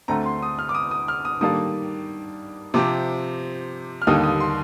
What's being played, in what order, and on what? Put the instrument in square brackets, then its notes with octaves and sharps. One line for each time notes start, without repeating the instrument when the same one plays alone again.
[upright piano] D2 D3 A3 C4 [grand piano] A#5
[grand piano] C6
D#6
F6
D6
D#6
D#6
F6
D#6
[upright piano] D#3 G3 A#3 D4 A4 [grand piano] D#6
[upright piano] C3 F3 C4 G4 [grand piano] D6
[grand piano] F6
[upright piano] D#2 D3 G3 A#3 D#4 [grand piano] D#6
[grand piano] D#6
C6